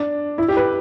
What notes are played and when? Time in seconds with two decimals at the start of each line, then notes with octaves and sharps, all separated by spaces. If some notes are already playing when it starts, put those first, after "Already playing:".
Already playing: D4
0.38 E4
0.48 G4
0.57 B4